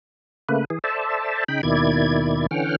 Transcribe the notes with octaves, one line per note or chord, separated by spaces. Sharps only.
C#3 A3 A#3 B4
E3 G#4
A4 C5 D5 E5 A5
C#3 D#4 G5 B5
D#2 B2 D#3 E4 D5 G#6
D3 E3 C#4 F#5 G5 F6